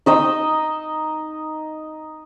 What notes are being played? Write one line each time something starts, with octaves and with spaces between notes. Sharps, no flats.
D#4 D#5 E6